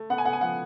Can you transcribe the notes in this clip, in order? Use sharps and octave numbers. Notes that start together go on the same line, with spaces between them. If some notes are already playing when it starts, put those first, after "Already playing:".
Already playing: A3
B3 F#5
G#5
B3 F#5
G#5
F3 F#5